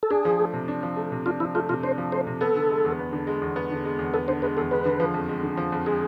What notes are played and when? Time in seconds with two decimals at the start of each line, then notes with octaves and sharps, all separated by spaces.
0.03 A4
0.11 D4 G#4
0.25 F3
0.39 A3
0.53 C3
0.68 D4
0.83 F3
0.97 A3
1.12 C3
1.26 D4 F4
1.40 F3 E4
1.55 A3 F4
1.69 C3 F4
1.83 D4 C5
1.98 F3
2.12 A3 C5
2.27 C3
2.41 B3 A4
2.56 D3
2.70 G#3
2.85 E2
2.99 B3
3.13 D3
3.27 G#3
3.42 E2
3.56 B3
3.71 D3
3.85 G#3
3.99 E2
4.14 B3 A4
4.28 D3 C5
4.42 G#3 B4
4.57 E2 A4
4.71 G#3 B4
4.86 D3
5.00 F3
5.14 F2
5.29 G#3
5.43 D3
5.57 F3
5.72 F2
5.86 G#3 G#4